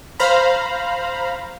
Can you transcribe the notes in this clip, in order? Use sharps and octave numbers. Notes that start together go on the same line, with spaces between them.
C5 F5 A#5 B5